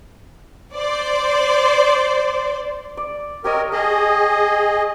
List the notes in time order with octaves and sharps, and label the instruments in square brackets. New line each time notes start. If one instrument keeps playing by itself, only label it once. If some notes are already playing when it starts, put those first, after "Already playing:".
[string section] C5 D5
[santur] D5
[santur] G4 C#5 D#5 [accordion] A#4
[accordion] G#4 D#5 [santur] A5